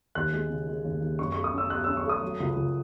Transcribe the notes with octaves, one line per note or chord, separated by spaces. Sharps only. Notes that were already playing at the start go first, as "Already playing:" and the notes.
D#2 F#6
G#3
C#3
G#3
D#2
D#2
F#2 C#6
C#6
A3
D#6
C#4 E6
F#2 F#6
E6
C#4
C#6
A3 D#6
F#3
C#2
C#2